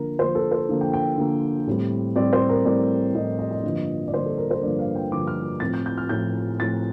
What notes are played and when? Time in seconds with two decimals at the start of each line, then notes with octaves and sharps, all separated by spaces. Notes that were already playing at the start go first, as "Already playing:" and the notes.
Already playing: D3 F3 A#3 A#4
0.19 D3 F3 A#3 C5
0.35 A4
0.52 C5
0.69 D3 F3 A#3
0.81 G5
0.94 G5
1.17 D3 F3 A#3
1.67 A2 G3 C4
2.16 A2 G3 C4 D5
2.33 C5
2.49 A#4
2.65 A2 G3 C4 D5
3.15 A2 G3 C4 D#5
3.39 D#5
3.51 D#5
3.63 G2 D3 F3 A#3
4.08 D5
4.13 G2 D3 F3 A#3 C5
4.26 A4
4.37 A#4
4.51 C5
4.63 G2 D3 F3 A#3 D5
4.79 F5
4.95 G5
5.11 G2 D3 F3 A#3 D6
5.27 F6
5.60 A2 F3 C4 A6
5.74 G6
5.86 G6
5.98 F6
6.09 A2 F3 C4 G6
6.59 A2 F3 C4 A6